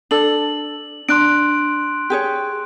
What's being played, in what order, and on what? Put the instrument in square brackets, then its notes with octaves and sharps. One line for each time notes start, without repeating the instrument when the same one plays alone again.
[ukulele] D4 A4 [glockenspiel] F#7
[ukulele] D4 [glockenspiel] C6 F#6 D7
[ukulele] G4 G#4 C#5